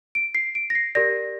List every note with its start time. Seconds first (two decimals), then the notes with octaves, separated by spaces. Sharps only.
0.15 D7
0.35 C7
0.55 D7
0.70 A#6
0.75 C7
0.95 G4 A#4 D5 A#6